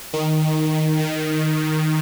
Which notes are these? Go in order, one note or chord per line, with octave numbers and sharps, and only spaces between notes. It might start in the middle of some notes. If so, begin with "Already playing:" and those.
D#3
D#3